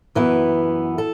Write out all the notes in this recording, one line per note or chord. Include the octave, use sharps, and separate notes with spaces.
F#2 E3 B3
A4